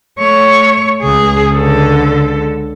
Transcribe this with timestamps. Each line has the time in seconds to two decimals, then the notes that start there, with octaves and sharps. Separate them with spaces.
0.18 A3 C#5
1.02 C#2 G#4
1.55 D3 A4